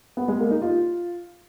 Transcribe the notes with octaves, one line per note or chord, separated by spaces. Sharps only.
B3
G#3
A#3
D#4
F4